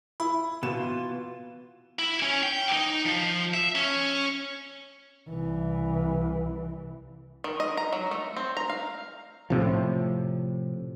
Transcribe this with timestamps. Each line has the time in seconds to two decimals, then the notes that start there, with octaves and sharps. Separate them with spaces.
0.20 E4 B5
0.63 B2 E3 F4 E7
1.99 E4
2.22 C#4
2.43 G5
2.73 D#4
3.05 F3
3.54 E5
3.75 C#4
5.29 C2 E3
7.44 D#3
7.60 D#5
7.77 A#5
7.92 F#3
8.11 A3
8.37 C4
8.57 A#5
8.69 F5
9.50 A2 C3 F3